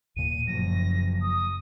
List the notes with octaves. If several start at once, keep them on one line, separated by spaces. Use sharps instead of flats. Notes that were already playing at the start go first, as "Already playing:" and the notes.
D#2 A#2 D#7
F#1 F3 F#3 A#6
D#6